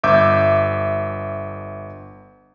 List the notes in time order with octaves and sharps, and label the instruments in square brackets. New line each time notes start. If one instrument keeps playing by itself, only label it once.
[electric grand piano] G1 E5 D6 G6